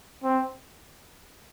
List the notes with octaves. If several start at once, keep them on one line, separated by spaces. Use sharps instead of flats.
C4